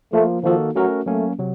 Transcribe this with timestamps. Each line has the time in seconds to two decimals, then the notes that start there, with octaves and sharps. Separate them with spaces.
0.13 F3 A3 A#3 F4
0.43 D#3 F3 A#3 D#4 F#4 A4
0.75 F#3 A3 C#4 F#4 A#4
1.06 F#3 A3 A#3 C#4
1.39 C3 F#3